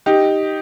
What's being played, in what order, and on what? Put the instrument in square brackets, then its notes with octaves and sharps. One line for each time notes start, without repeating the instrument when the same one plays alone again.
[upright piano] D#4 G4